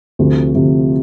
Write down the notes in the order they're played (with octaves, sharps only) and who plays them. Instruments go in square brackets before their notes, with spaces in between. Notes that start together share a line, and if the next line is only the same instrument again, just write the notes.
[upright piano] D2 C3 F3
D2 C3 F3